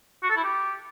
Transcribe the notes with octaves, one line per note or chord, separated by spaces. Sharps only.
F#4
A4
E4
G4